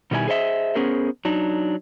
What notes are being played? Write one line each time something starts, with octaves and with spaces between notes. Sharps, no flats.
B2 D#3 G3 E4 B4 G#5
G#4 C5 D#5 E5
B3 C#4 G#4 A#4 C5
F#3 D4 D#4